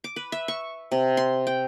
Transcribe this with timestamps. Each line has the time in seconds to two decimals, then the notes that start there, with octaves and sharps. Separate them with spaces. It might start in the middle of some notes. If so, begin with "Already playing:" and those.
0.04 D6
0.16 B4
0.32 E5
0.48 C#6
0.92 C3
1.17 C6
1.47 G5